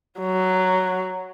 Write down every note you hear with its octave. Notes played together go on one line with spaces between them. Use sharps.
F#3